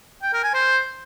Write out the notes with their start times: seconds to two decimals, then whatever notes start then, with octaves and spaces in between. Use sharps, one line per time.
0.23 G5
0.33 A#4
0.44 G#5
0.54 C5